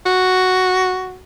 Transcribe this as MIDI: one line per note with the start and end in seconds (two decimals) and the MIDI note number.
0.06 1.19 66